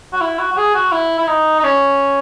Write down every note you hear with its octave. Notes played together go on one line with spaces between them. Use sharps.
F#4
E4
F#4
F#4
G#4
F#4
E4
E4
D#4
D#4
C#4